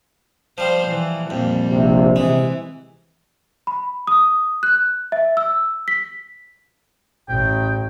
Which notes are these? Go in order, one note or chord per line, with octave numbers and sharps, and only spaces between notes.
F3 G3 C5
E3
F2 A#2 G3
A#1 C3
C3 E3 G#3
B5
D#6
F#6
E5
E6
B6
A1 G5